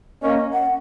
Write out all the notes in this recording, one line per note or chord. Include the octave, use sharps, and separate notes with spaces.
A#3 C#4 D#5
F#5